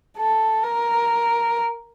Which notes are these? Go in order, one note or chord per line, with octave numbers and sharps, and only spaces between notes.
A4
A#4